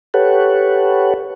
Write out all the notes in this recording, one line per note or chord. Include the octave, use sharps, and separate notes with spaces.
G4 A4 B4 C#5 F#5